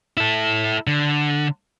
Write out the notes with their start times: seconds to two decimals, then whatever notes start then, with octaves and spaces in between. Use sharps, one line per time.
0.17 E4 A4
0.87 D3